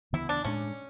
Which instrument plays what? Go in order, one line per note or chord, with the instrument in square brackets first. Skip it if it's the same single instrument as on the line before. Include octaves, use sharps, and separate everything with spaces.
[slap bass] D2 C#3 E3 B3 [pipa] E4
[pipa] D4
[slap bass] A2 G#3 D4 [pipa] C#4